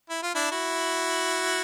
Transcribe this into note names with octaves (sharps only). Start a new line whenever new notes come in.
E4
F4
D4 E4
E4 F#4